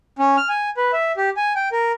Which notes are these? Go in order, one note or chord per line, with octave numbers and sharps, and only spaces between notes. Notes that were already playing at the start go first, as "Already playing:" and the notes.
C#4
F6
G#5
B4
E5
G4
G#5
G5
A#4